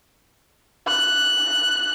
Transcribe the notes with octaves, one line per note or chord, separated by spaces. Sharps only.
F#6